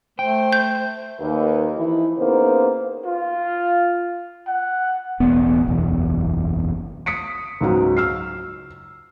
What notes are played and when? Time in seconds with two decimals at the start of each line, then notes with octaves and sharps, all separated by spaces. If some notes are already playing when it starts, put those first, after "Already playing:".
0.19 A3 C5 G5
0.53 G6
1.20 D#2 B4
1.77 E3 F3 D#4 E4
2.18 C#3 A#3 B3 D#4 C5
3.06 F4
4.47 F#5
5.20 E1 A1 B3
5.67 F#1 B1 E2
7.06 D#6 B6 C#7 D7
7.61 C#2 G#2 F#3
7.97 E6 F6 C7